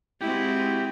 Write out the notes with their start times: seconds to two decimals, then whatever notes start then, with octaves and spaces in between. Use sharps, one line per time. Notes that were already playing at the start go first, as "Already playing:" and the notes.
0.21 G#3 C4 E4 F#4 G4